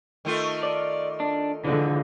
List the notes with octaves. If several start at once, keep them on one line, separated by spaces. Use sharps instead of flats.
D#3 A3 F4
D5
D4
D3 E3 F3 G#3